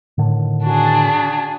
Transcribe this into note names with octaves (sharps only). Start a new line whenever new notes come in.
A2 D3 D#3
D4 F#4 G#4